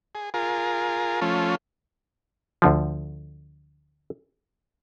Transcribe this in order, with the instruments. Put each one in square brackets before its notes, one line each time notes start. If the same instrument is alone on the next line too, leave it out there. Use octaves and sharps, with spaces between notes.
[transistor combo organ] G#4
F4 G#4 A#4
F3 A3 C#4 F4
[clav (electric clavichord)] D2 D3 F3